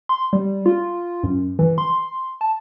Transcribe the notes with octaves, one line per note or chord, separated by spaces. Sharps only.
C6
G3
F4
F#2
E3
C6
A5